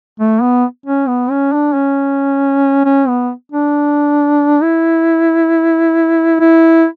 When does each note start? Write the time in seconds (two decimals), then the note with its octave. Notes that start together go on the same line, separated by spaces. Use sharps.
0.20 A3
0.41 B3
0.86 C#4
1.08 B3
1.31 C#4
1.53 D4
1.74 C#4
2.85 C#4
3.08 B3
3.52 D4
4.63 E4
6.40 E4